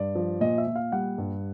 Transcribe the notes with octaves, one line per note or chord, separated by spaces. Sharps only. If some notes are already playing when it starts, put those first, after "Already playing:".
Already playing: G2 D5
F3
A#2 D#5
E5
A#2
F5
G3 F#5
G2